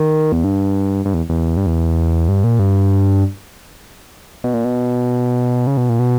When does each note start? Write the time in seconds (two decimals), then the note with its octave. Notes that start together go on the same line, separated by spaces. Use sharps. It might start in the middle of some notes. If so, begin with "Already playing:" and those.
Already playing: D#3
0.32 E2
0.44 G2
1.05 G2
1.14 E2
1.29 E2
1.57 G2
1.66 E2
2.28 G2
2.44 A#2
2.59 G2
4.44 B2
4.54 A#2
4.65 B2
5.67 C#3
5.77 B2
5.89 A#2
5.99 B2